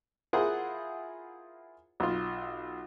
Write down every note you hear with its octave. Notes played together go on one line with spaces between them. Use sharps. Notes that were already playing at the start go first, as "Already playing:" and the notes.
E4 F4 G#4 A#4 C5 F#5
B1 F4